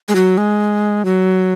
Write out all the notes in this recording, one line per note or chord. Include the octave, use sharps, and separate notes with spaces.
G#3
F#3
G#3
F#3